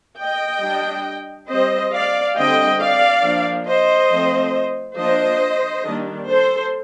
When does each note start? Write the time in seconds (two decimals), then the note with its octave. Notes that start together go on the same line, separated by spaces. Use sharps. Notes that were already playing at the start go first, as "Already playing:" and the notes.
0.19 D#5 G5
0.63 G3 D4
1.49 G3 C4 C5 D#5
1.93 D5 F5
2.37 D3 G3 C4 D#5 G5
2.80 D5 F5
3.24 F3 A#3 D4
3.67 C5 D#5
4.11 F3 A3 C4
4.98 F3 A#3 D4 C5 D#5
5.85 D#3 G3 A#3 D4
6.28 A4 C5